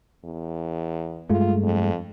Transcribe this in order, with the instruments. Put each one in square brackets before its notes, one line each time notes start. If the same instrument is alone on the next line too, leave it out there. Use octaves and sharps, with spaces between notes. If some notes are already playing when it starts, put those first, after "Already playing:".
[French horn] E2
[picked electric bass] G2 G#3 A3 [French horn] F4
[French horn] F2